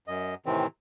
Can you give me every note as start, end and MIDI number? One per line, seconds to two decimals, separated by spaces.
0.08 0.35 42
0.08 0.35 75
0.46 0.66 45
0.46 0.66 48
0.46 0.66 51
0.46 0.66 52
0.46 0.66 60